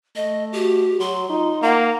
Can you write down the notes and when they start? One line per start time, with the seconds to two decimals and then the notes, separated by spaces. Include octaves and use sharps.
0.16 A3 D#5
0.53 F#4 G4
1.00 F#3 C6
1.30 D#4 F4
1.62 A#3 F#5 A#5